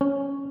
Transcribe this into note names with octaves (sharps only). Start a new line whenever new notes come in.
C#4